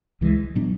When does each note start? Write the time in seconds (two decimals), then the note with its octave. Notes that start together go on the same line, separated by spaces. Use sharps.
0.21 C#2 C#3 E3 G#3
0.55 A#2 F#3 B3 D4